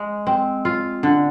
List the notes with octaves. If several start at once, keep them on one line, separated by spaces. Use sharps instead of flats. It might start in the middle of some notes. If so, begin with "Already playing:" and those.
Already playing: G#3
C4
F4
D3